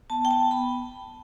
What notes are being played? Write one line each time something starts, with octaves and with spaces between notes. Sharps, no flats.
B3 A5
G5
B3 A5
B3 B5